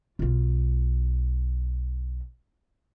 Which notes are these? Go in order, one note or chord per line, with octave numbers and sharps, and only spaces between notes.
B1 F4